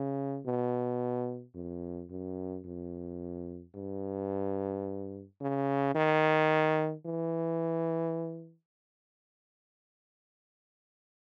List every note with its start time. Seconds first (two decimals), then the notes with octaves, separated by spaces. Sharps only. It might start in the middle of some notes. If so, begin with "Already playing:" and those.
Already playing: C#3
0.46 B2
1.55 F2
2.10 F#2
2.65 F2
3.75 G2
5.41 C#3
5.95 D#3
7.05 E3